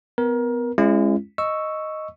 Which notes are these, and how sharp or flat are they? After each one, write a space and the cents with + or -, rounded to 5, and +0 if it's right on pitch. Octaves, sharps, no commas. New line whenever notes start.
B3 +25 A#4 +25
G#3 +0 C#4 -25 E4 +45
D#5 +0 C#6 +0 E6 +0